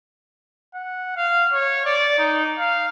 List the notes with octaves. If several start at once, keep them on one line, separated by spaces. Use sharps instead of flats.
F#5
F5
C#5
D5
D#4
F5